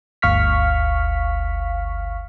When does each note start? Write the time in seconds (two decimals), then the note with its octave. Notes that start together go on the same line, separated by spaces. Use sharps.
0.22 G1 D2 F5 C#6 F6 B6